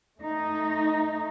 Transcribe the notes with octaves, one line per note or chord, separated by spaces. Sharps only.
A3 D#4